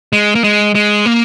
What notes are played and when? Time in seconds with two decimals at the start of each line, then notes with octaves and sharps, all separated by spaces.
0.13 G#3
0.35 A#3
0.44 G#3
0.75 G#3
1.06 A#3